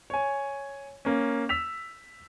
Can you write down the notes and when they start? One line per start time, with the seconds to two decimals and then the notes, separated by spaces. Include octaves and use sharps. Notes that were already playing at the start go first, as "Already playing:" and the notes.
0.10 C#5 G#5
1.05 A#3 C#4
1.49 E6 B6 F7